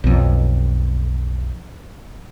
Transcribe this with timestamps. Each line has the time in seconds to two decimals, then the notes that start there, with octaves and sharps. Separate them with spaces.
0.04 B1 F2